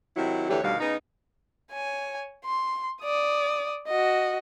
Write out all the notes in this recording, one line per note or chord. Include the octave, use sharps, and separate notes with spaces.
C3 D#3 F#3 E4
D2 D3 E3 G4 C#5
D2 B2 D#3 G3 F5
C#3 B3 D#4
C#5 G#5
C6
D5 D#6
F#4 D#5